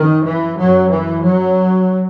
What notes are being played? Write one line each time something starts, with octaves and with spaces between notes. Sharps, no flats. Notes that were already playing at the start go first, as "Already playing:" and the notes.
Already playing: F#2 D#3
E3
F#2 F#3
E3
F#3